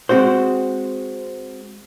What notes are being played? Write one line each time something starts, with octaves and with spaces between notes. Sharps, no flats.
G#3 C4 F#4 C5